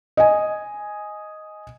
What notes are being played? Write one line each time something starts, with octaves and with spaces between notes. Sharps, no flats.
D#5 G#5